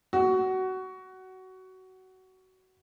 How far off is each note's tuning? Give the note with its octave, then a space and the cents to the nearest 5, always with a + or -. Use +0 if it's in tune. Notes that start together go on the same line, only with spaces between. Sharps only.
F#4 +20